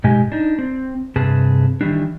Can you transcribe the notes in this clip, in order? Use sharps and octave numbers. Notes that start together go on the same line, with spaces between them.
G#2 B2 G#3 G4 G#5
D4 D#4
C4
G2 C3 C4 G#4 B4 A5
D#3 E3 G3 D4